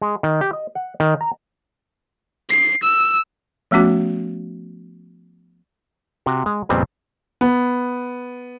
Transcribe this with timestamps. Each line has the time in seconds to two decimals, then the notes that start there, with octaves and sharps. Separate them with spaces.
0.02 G#3
0.23 D#3
0.41 G4
0.53 D#5
0.75 F#5
1.00 D#3
1.21 A#5
2.50 C7
2.83 E6
3.71 F3 A3 B3 C#4 F#4
6.26 C3 F#4
6.46 G#3
6.69 F2 A#2 C#3 G3 B3 C4
7.41 B3